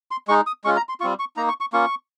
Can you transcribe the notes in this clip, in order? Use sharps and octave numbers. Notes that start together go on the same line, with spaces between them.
C6
G#3 D#4 C#6
D#6
G#3 C#4 F4 C#6
A#5
C6
G3 C4 F4 C#6
C#6
A#3 D#4 A#5
C#6
C#6
A#3 C#4 F4 C#6